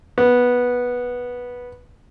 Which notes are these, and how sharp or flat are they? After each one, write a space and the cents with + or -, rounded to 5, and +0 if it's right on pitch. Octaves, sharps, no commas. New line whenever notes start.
B3 -10